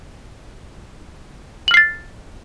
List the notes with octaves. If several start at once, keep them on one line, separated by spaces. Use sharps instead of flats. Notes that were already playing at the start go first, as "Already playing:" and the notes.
F6 A6 C7 F#7